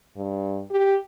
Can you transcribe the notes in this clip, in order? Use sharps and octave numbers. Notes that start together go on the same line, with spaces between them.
G2
G4